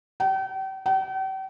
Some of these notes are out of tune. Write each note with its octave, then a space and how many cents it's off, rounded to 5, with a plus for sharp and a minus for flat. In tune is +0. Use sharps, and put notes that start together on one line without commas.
G5 -40
G5 -45